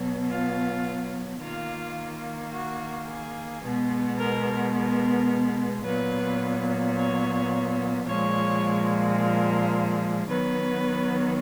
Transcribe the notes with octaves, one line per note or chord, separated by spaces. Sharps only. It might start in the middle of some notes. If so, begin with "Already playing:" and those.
Already playing: B2 F#3 B3
F4
D#3 A#3 F4
F#4
G#4
B2 G#3 B3
A#4
A#4
A#2 F#3 B3 B4
C#5
A#2 F3 G#3 C#5
A#4
D#3 F#3 B3 B4